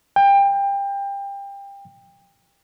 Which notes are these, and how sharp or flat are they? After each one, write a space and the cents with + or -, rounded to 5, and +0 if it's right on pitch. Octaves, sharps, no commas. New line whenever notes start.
G5 +25